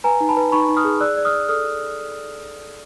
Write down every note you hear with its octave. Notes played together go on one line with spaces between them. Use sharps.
B4 G#5 A#5
D#4
A5 B5
B4
D#4 B5 C#6
D#4
D#6 F6
G#4
D5 E6 F#6
D5
D#6 F6
D5
A4 D#6 F6